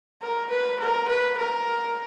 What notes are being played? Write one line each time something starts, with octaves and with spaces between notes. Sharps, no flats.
A#4
B4
A#4
B4
A#4